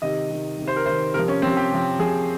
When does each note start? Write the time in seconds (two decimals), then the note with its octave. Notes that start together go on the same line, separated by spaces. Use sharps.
0.02 C3 D#3 D#5
0.30 C3 D#3
0.58 C3 D#3
0.67 C5
0.76 A#4
0.86 C3 D#3 C5
1.14 C3 F3 A#4
1.28 C#4
1.42 C3 F3 C4
1.57 G4
1.72 C3 F3
1.99 C3 F3 G#4